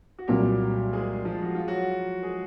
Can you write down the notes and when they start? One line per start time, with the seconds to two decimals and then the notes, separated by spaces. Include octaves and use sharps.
0.19 F#4
0.28 C2 A#2 F#3 G3 G4
0.93 G#3 G#4
1.25 F3 F4
1.42 F#4
1.55 F4
1.68 F#3 F#4
2.23 G#3 G#4